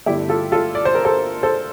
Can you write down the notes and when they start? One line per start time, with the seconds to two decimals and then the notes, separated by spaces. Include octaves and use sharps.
0.06 G1 G2 D3 A3 E4 G4
0.29 F4 A4
0.52 F4 A4
0.75 D5
0.85 C5
0.95 A#4
1.05 A4 C5
1.43 A4 C5